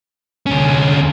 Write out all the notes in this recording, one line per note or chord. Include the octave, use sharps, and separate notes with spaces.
D2 C#4